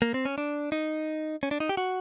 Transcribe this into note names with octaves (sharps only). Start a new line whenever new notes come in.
A#3
C4
C#4
D4
D#4
C#4
D4
D#4
G4
F#4